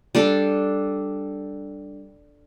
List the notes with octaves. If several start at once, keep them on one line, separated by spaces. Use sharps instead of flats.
G3 D4 A4